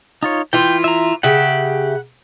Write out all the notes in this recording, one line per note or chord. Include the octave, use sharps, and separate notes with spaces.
D#4 F4 C#5
E3 F4 G5
E5 A#5
C#3 G4 E5 F#5